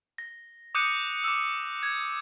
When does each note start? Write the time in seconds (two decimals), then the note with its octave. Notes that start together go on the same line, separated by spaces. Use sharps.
0.18 A#6
0.75 D6 D#6 F#6 G6 C#7 D#7
1.24 D6 E6
1.83 G#6